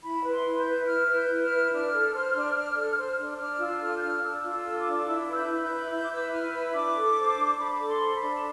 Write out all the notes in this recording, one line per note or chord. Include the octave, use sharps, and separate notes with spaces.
E4 B5
B4
C6
E4
G6
B4
E4 F6
B4
G6
E4
F6
B4
D4 F6
A4
C5
D4
D4
A4
C5
D4
D4 F6
F4 E6
A4 F6
G6
D4 F6
D4 E6
F4
E6
A4
D6
D4
E4 E6
B4
G6
E4
G6
B4
E4 G6
D6
B4 E6
E4 F6
B4 E6
D4 D6
A4
C5
D4
D4 B5
A4 D6
C6
C5
B5
D4
A5